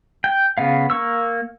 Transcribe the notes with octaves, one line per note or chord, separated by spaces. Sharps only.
G5
C#3 B3 F5
A#3 C#6 E6